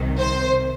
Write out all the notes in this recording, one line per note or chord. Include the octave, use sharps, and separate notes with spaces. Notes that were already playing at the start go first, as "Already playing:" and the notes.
Already playing: C2 C3 D#3
C5